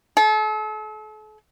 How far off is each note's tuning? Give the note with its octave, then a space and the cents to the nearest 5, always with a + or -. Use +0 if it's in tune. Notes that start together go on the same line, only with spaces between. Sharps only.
A4 -40